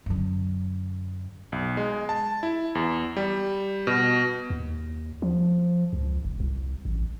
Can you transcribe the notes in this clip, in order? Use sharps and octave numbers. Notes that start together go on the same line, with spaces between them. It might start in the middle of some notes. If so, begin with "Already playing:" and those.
F#2 D3
B1
G#3
A5
E4
E2
G3
B2
D#2
F3
C#2
F1
C2
A1